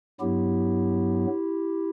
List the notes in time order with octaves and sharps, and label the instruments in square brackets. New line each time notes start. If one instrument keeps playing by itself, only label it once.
[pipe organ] G2 F#3 B3 E4 G4